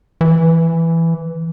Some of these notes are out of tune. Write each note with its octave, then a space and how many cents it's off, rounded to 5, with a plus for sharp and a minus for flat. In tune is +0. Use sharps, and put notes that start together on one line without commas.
E3 +5